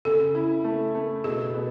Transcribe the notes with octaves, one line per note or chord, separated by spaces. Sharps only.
C#3 A4
E4
A3
A3
B2 G#4
B2